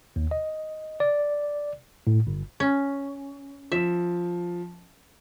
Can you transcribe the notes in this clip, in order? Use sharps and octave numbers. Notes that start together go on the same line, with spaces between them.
D#2
D#5
D5
A2
G1
C#4
F3 E5